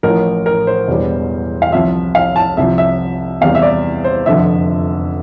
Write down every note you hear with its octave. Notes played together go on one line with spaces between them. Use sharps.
A1 A2 F3 A#4
A#4
C5
E1 E2 E3 G3
F5
C2 C3 F3 E5
F5
A5
C2 C3 F3 E5
E5
E2 C3 G3 F5
E5
D5
C5
F1 F2 D3 F3 E5